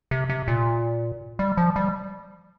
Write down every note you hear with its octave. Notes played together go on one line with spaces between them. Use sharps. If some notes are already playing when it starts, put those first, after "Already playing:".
C3
C3
A#2
G3
F3
G3